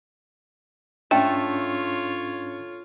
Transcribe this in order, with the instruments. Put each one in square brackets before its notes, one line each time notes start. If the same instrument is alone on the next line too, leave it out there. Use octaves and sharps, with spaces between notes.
[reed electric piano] G#2 C#4 D4 [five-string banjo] A3 [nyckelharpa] F4 C#5 [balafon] G5